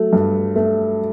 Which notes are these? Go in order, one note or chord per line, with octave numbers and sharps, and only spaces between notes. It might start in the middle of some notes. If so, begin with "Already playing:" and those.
Already playing: F#3 A3
G2
A3